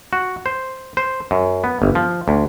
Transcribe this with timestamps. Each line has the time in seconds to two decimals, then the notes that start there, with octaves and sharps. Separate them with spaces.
0.13 F#4
0.46 C5
0.97 C5
1.31 F#2
1.64 B3
1.82 G1
1.95 F3
2.28 D2